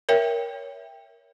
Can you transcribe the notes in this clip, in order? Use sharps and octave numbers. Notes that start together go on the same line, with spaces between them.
A#4 C#5 E5 G5